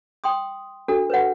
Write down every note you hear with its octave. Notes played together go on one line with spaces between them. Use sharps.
G5 C6 D#6
D4 F#4 A4
B4 C#5 F#5